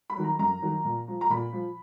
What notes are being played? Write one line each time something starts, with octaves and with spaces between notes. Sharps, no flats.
B5
D#3 F#3
A#5
F#2 A#5
D#3 F#3
A#2
F3
A#5
A#2 B5
F3